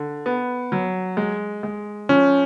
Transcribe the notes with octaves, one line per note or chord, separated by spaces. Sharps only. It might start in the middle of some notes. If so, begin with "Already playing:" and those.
Already playing: D3
B3
F#3
G#3
G#3
F3 C#4